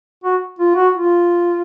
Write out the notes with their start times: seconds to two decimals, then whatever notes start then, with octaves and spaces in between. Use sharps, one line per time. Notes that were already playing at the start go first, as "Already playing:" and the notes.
0.24 F#4
0.59 F4
0.76 F#4
0.93 F4